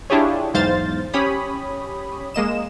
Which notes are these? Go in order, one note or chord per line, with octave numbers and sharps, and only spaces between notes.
D4 E4 F4 G4 G#4 C#5
B1 E2 G#2 C5 F5 A6
C#4 G4 C#5 B5 D#6
G#3 A#3 D#5 E7